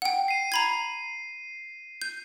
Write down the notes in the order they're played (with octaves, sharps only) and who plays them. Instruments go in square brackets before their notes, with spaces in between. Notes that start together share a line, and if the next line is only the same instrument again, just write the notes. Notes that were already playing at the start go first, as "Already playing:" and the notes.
[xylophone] F#5 G5
[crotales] C7 D#7
[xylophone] A#5 B5 G#6
G6